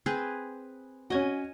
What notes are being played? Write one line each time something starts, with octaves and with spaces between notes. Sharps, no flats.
C4 G#4 B4
C#4 F#4 D#5 G#5